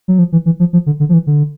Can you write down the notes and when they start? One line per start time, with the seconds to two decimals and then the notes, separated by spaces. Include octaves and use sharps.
0.08 F#3
0.19 F3
0.32 E3
0.46 E3
0.60 F3
0.73 F3
0.86 D3
1.00 D3
1.09 F3
1.13 E3
1.27 D3